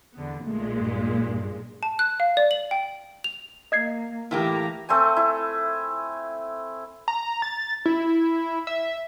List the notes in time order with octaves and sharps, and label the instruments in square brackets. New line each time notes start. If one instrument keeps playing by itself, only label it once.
[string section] E2 D3 B3
[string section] B1 A#2 G#3 [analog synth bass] A3
[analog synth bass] G2
G2
[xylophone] A5
F#6
F5
D5
F#7
G5
F7
[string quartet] A#3 [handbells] D#5 G#6 C7
[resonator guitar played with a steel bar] A2 A#3 G4 [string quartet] E3 A#5
[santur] A3 C4 G#5
E4
[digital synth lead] A#5
A6
E4
E5